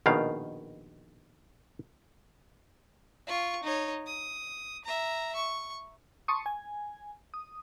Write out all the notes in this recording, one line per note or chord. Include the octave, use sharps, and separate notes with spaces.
A#1 B2 D#3 F5
F4 C#6
D#4 C#5
D#6
E5 A#5
C#6
A5 C6 C#6 D#6
G#5
D#6